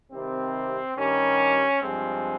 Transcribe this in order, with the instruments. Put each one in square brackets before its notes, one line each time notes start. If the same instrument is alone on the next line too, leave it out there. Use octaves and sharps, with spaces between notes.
[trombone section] C3 D#3 G3 C4
G2 D#3 G3 C#4
G2 F3 G#3 C4